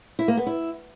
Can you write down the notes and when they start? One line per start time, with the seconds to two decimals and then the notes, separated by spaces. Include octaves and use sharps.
0.19 E4
0.28 A#3
0.37 B3
0.47 E4